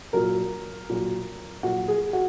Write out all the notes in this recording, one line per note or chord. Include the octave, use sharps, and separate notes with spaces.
A#2 F#3 A#4
A#2 F#3
A#2 F#3 F#4
G#4
F#4